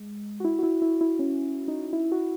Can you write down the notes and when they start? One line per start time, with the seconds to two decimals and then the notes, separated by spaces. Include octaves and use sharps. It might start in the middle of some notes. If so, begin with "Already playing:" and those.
Already playing: G#3
0.40 F#4
0.44 E4
0.59 F#4
0.63 E4
0.82 E4
1.01 E4
1.19 C#4
1.68 D#4
1.93 E4
2.12 F#4